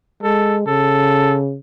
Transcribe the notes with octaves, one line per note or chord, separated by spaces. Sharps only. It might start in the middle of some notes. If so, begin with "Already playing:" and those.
G#3 A4
C#3 A4